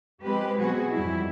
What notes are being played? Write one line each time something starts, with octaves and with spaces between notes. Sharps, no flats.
F3 G#3 C4 G4 B4
B2 F#3 C4 F#4 G#4
F2 G#2 E3 G3 E4